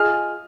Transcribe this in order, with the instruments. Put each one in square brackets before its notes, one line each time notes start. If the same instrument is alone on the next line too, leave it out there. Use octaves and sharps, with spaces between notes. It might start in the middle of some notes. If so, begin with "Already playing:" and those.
Already playing: [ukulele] F4 G#4 D#5 G#5 [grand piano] F6